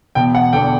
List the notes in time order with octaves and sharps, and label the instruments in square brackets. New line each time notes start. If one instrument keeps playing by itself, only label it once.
[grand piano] E1 G5
F#5
E2 D3 G5